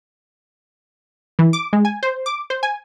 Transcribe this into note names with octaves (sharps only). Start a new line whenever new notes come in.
E3
D6
G#3
G#5
C5
D6
C5
G#5